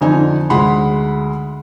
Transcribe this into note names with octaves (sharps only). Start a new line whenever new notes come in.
F2 D3 D#4 G#5
D2 G#3 F#5 B5 C6